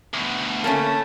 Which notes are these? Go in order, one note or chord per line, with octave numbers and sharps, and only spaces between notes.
D2 B2
A3 A#3 C4 C#4 E4 A5